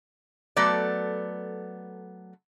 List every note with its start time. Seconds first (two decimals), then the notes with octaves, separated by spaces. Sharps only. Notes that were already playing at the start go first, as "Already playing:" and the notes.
0.56 F#3 A3 B3 A4 D5